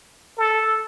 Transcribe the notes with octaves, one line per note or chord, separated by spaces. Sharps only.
A4